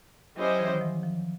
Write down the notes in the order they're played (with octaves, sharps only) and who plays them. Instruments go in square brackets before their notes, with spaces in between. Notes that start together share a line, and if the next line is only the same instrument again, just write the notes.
[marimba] F#3 [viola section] C#4 E4 G4 C5 D#5
[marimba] F#3
E3
D#3
F3
F3